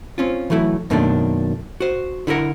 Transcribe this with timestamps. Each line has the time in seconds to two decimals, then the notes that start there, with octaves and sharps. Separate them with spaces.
0.18 C4 C#4 F4
0.50 E3 F#3 A3 E4
0.90 F#2 B2 D#3 A3 A#3 D4
1.80 F#4 C5
2.27 D3 E4 G#4 A#4 F#5